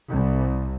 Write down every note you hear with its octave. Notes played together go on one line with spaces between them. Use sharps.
C2